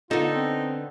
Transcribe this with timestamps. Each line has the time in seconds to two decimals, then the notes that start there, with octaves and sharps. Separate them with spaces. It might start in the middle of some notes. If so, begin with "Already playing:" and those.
0.11 D3 B3 D#4 F4 A4
0.35 C4